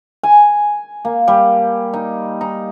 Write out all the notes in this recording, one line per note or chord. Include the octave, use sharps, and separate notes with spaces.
G#5
A#3
G3
D#4
D#4